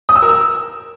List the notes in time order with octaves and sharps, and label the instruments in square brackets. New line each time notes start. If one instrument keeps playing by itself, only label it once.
[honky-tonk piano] D#6
E6
A#4
E6